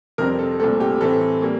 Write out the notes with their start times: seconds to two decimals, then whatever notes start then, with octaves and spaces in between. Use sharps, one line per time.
0.18 F2 C3 G3 C4 A#4
0.39 A4
0.60 C2 A#2 A3 C4 A4
0.80 G4
1.01 A2 E3 A3 C4 A4
1.42 G3 A#3